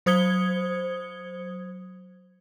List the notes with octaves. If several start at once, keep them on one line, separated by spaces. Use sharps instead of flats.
F#3 C5 D#6 G#6 C#7 G7